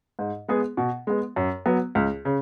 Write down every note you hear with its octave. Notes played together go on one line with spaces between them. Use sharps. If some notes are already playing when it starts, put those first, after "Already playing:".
G#2
G#3 B3 G#4
B2
G#3 B3
F#2
F#3 B3
C#2
C#3